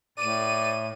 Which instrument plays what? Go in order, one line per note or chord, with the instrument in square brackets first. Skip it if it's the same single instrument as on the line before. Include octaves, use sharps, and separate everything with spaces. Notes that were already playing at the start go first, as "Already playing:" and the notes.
[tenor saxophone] A2 [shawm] D5 [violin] D#7